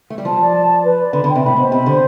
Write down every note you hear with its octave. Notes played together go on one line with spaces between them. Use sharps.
A3
G3
F3 A5
D5
A5
D5
B4
D5
D3 B5
D3
G5
C3
A2 B5
B2 C5
C3 B5
D3 C5